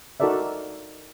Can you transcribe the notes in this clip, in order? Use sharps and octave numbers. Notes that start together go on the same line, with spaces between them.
D#4 F#4 A4 A#4 D5 E5